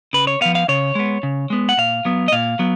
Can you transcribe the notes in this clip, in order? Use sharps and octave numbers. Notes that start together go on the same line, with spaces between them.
C#3 B4
C#5
F3 B3 F5
F5
C#3 C#5
G#3 B3
C#3
G#3 B3
F#5
A#2 F5
F#3 B3
D#5
A#2 F5
F#3 B3